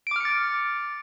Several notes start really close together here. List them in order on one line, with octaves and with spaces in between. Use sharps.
D7 D6 F6 C#7 A6